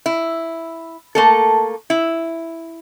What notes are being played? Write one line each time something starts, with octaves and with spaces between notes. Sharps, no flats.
E4
A3 A#3 A4
E4